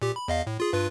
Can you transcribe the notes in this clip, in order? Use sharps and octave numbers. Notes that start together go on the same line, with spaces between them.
A#2 G4
B5
E2 D#5 F5
A2
F4 G#4
G2 F4 B4